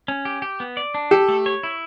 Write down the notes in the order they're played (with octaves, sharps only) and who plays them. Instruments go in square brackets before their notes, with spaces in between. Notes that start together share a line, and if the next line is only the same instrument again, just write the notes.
[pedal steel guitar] C#4
G4
G4
B3
D5
D4
[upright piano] G4 [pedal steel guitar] A4
[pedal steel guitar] A3
C#5
E4